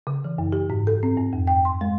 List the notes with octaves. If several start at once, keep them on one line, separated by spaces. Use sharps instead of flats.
C#3
E3
F#2
G4
G#2
A4
C4
G2
F2
G5
C6
G#3